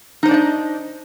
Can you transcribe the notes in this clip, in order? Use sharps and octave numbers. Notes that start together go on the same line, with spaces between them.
D4 D#4 C5 D5 D#5